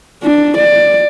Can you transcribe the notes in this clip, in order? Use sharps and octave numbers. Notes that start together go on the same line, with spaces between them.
D4
D5